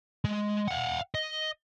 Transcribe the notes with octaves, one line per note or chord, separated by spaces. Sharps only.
G#3
F5 F#5
D#5